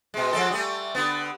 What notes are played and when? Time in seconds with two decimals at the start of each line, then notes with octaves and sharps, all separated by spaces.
0.14 B2 G#3
0.32 F3 G#3 A4
0.51 G3 A3
0.95 D3 B3